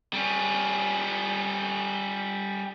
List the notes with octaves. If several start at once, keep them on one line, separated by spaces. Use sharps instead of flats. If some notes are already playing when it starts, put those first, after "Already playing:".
G3 C#4